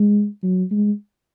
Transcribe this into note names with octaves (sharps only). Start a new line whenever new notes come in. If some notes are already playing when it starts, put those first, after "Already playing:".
Already playing: G#3
F#3
G#3